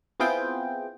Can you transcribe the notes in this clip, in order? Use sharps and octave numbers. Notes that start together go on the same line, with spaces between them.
B3 C4 E4 F4 G#4 G5